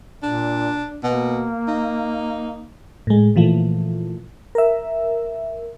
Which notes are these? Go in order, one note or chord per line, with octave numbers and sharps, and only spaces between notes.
A#2 D4
B2 A#3
D#4
A2 G#3
A#2 E3 F3 A3
A#4 E5